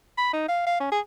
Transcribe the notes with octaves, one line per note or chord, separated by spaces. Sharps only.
B5
D#4
F5
F5
C#4
G#4